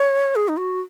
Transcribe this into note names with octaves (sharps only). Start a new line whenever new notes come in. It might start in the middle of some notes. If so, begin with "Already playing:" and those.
Already playing: C#5
G#4
D#4
F#4